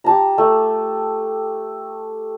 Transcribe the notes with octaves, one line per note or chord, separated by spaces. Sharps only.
G4 A5 A#5
A3